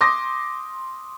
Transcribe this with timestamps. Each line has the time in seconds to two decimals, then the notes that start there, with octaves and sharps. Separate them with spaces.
0.01 C6 D6 D#6 A#6